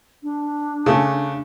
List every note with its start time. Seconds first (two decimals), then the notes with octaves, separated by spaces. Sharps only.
0.23 D4
0.86 C#3 A3